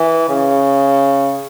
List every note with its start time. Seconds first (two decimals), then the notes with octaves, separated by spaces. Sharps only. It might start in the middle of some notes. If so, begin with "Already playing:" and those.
Already playing: E3
0.29 C#3